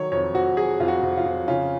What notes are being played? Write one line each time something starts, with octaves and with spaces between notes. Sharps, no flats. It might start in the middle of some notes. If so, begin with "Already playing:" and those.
Already playing: D#3 F#3 C#5
F2 C#5
F2 F#4
F#3 G#4
F2 F4
F#4
F2
F4
F2
C#3 F4